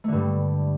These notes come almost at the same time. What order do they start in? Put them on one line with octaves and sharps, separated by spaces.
A3 D3 G2 G3